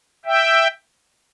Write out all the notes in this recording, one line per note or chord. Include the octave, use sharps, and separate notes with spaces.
E5 G5